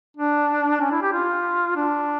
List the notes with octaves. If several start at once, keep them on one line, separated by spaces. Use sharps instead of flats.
D4
C#4
E4
G4
F4
D4